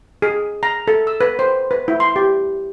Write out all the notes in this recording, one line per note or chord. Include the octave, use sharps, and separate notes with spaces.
G#4
A#5
A4
E6
B4
C5
B4
E4
C6
G4